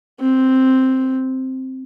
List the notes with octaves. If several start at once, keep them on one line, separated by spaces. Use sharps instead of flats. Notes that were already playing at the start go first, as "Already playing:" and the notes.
C4